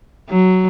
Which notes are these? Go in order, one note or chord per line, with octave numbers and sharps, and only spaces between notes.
F#3